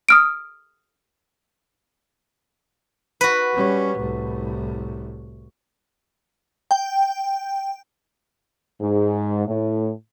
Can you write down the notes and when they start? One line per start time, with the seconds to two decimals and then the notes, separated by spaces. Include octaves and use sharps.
0.09 D#6 F6 D7
3.21 F#4 B4
3.53 G3 C#4
3.98 C2 A2
6.71 G5
8.81 G#2
9.47 A2